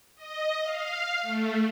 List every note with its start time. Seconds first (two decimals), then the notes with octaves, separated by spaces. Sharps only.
0.16 D#5
0.62 F5
1.22 A3